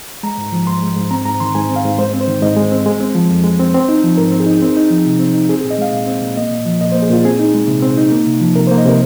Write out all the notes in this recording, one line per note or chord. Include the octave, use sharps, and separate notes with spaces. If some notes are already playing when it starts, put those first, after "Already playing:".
G#3 A#5
G#2
F3
G#2 C6
G#3
G#2
C4 A#5
G#2 A#5
D#3 C6
G#2 G#5
C4
F5
G#2
G#3 C5
C4
C5
D#3
G#2 D#5
G#3
C4
G#3
C4
F3
F2
G#3
C4
C4
D#4
F3
G#2 A#4
C4
G#4
D#4
C4
D#4
F3
C3
C4
D#4
C4 G#4
G#4
A#2
D#5
G#3 F5
A#2
C4
A#2
A#3 D#5
A#2
F3
A#2 D#5
C5
A#3
G#4
A#2 F4
C4 G#4
D#4
G#3
C3
C4
D#4
A#3
C3
F3
C3 A#4
C5
A#3
D#5
C3 A#4